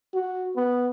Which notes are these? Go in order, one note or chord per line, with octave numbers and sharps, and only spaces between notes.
F#4
B3